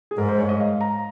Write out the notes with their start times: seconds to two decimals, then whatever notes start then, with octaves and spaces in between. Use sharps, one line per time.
0.11 G#4
0.17 G#2 A#4
0.28 C5
0.39 C#5
0.49 D#5
0.60 F5
0.81 A#5